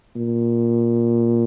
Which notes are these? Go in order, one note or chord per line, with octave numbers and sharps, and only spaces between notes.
A#2